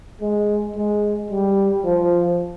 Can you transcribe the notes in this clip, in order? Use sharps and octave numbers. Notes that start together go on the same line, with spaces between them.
G#3
G#3
G3
F3